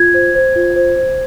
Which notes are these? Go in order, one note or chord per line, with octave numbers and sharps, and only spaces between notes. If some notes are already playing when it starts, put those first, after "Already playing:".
Already playing: F4 G#6
C5
C5
F4
C5
C5